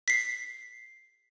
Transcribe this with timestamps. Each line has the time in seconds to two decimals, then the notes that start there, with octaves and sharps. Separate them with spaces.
0.08 B6 C7